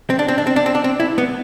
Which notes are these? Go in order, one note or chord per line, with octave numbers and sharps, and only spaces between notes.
C4
D4
C4
D4
C4
D4
C4
D4
C4
E4
B3